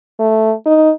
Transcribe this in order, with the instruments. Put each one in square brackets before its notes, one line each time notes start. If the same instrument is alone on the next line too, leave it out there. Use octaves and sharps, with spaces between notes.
[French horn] A3
D#4